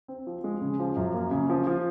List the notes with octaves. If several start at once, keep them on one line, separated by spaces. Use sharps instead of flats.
C4
F3
G#3
C#3
F3
F#2
A#3
C#3
F3
F3